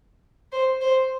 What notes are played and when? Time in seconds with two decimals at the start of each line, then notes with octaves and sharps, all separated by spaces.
0.52 C5
0.81 C5